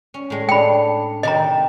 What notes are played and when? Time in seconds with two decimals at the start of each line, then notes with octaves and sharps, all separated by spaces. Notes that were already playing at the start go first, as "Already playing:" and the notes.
0.14 C#4
0.30 A2 G#3
0.49 D4 G5 B5
1.23 C3 D#3 G4 D#5 A#5